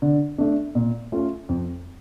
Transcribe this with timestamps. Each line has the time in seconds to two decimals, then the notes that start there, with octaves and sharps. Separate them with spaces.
0.02 D3
0.38 A3 D4
0.75 A#2
1.12 A3 C#4 F4
1.49 F2